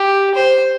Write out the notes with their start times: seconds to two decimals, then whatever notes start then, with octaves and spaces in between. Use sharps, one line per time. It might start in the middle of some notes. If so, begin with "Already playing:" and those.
Already playing: G4
0.35 C5